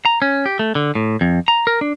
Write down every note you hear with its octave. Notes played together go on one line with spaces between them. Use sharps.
A#5
C#4
G4
A3
D3
A2
F2
A#5
A#4
D4